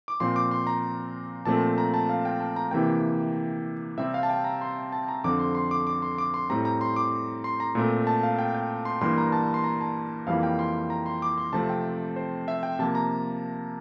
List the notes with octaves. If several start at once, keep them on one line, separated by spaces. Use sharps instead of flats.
D6
A#2 F3 C4 C6
D6
C6
A#5
A#2 F3 A3 C4 A5
A#5
A5
F5
G5
A5
A#5
C3 E3 A#3 G5
C3 G3 C4 E5
F5
A5
G5
A#5
C6
A5
A#5
F2 D3 F3 C4 D6
C6
C6
D6
D6
C6
D6
C6
A2 G3 C4 A#5
A#5
C6
D6
C6
A#5
A#2 A3 C4
A5
F5
G5
G5
C6
G2 E3 G3 A#3 C6
A#5
A5
C6
A#5
A5
F2 E3 G3 A#3 F5
G5
C6
A#5
C6
D6
C6
C3 F3 A3 C4 A5
G5
C5
E5
G5
C3 F3 A#3 A5
A#5